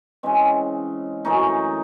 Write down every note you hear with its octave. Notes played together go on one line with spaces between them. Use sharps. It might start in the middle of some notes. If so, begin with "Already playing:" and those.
C#3 E3 G#3 C4
F#2 E3 A3 D#4